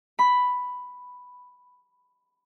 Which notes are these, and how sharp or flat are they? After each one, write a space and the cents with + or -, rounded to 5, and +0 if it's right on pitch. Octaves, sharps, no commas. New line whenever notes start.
B5 +5